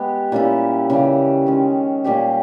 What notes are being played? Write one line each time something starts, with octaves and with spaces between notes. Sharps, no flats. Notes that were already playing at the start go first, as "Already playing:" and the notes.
Already playing: G#3 B3 G4
A#2 G3 C#4 E4
C#3 E3 G3
D#3 G#3 C#4
A#2 G3 C#4 G4